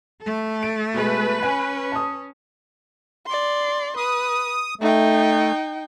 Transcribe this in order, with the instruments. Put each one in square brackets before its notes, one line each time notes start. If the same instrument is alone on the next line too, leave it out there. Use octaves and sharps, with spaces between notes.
[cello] A3 A4
[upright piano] D7
[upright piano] B2 G#3 [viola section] B4
[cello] C#4 [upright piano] G#5
[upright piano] A5 D#6
[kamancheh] D5 C6
[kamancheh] B4 [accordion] D#6
[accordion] A3 [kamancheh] D#4 G5